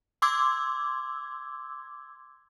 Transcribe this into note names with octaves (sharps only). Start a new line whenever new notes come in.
C6 D6 E6 G#6